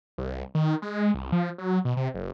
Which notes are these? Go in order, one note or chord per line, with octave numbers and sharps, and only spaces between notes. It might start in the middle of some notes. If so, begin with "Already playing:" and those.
C2
D#3
G#3
C2
F3
F#3
B2
C3
F#1